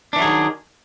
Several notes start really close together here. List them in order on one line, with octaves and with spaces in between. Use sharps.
D4 E3 F#3 G#4 D#3